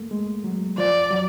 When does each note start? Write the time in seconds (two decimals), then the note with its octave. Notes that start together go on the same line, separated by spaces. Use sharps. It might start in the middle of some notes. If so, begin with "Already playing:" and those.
Already playing: A3 A#3
0.11 G#3
0.44 F#3
0.77 F3 D5
1.11 F#3